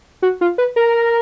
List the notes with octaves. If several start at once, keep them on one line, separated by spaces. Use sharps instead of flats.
F#4
F4
B4
A#4